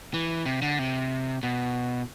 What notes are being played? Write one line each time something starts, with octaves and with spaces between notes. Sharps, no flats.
E3
C3
D3
C3
B2